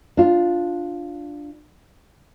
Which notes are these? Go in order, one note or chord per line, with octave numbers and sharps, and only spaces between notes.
D4 F4